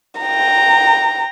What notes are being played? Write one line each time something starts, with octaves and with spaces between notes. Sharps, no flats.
G5 A#5